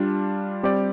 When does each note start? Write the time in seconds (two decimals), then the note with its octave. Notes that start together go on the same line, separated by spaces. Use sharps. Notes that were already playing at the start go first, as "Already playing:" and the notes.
Already playing: G3 D4 F4
0.63 G3 C4 G4 D5